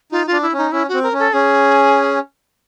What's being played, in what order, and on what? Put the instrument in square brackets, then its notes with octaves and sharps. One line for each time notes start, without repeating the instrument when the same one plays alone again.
[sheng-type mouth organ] D#4 [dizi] F4
[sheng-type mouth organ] D4 [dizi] F4
[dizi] E4
[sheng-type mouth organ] C#4 [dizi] D#4
[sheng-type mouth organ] C#4 [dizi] E4
[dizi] F#4
[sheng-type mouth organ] C4
[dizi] A#4
[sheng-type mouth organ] C#4
[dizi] A4
[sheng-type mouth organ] C#4 [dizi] G#4